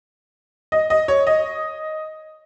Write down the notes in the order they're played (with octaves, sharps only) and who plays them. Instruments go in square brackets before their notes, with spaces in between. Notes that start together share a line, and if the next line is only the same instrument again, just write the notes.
[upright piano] D#5
D#5
C#5
D#5